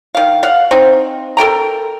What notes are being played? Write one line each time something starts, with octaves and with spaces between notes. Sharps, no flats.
D#3 F5
F5 F#5
C4 D#4
A4 A#4 G5 A#5